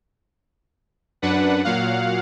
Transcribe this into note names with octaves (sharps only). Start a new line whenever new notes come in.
F#2 D4 B4 F#5
A#2 F#3 F5 F#5